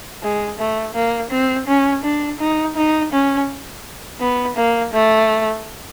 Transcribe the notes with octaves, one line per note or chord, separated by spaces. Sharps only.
G#3
A3
A#3
C4
C#4
D4
D#4
D#4
C#4
B3
A#3
A3